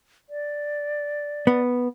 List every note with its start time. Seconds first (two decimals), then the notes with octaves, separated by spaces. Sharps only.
0.29 D5
1.47 B3